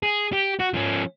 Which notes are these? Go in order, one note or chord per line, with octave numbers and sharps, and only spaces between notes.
G#4
G4
F#4
F3 C#4